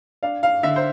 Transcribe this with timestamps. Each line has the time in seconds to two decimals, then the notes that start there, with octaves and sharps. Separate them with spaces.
0.23 D4 F5
0.43 F5
0.63 D3 E5
0.76 C5